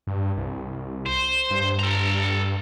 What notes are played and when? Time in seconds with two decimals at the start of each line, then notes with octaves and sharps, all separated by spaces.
0.07 G2
0.37 C2
1.06 C5
1.50 G2
1.79 A4 A#5